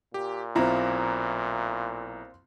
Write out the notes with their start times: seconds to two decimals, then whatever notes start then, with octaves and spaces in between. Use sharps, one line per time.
0.14 A#2 G4
0.55 B1 C4 E4 F4 A#5